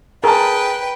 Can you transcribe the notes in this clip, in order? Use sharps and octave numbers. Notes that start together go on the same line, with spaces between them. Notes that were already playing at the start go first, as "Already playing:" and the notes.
G#4 A#4 B4 G5 A5